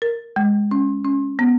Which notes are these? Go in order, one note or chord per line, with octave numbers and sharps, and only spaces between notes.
A#4
G#3
C#4
C#4
B3